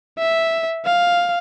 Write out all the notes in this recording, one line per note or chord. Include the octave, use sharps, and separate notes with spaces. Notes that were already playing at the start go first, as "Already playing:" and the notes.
E5
F5